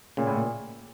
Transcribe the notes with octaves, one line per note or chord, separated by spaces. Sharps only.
A#2 C#3
A2
A#2